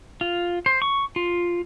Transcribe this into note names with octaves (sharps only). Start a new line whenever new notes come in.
F4
C5
C#6
F4